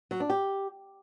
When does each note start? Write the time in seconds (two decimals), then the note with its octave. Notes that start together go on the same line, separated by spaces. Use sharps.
0.11 F#3
0.20 D4
0.30 G4